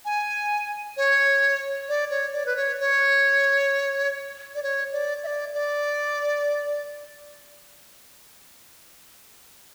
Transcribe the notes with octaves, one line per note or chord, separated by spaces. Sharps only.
G#5
C#5
D5
C#5
D5
B4
C#5
C#5
D5
C#5
D5
E5
D5
D5